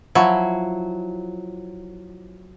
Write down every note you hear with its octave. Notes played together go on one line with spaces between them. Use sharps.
F3 F#3 E4